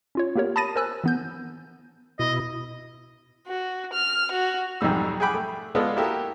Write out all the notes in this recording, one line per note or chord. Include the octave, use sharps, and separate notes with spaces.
C#4 F4 C#5
A#3 B3 G4 A#4 C#5
A5 B5 D#6 A6 A#6 D#7
A#4 C5 G#5 E6 F#6
E3 B3 G6
B2 E4 D#5
F#4
F6
F#4
B1 F2 G#2 G3 E6
G#4 F#5 G5 B5 D6
A3
G#3 B3 F4 A4 D5
A#3 E4 F#4 G4 A4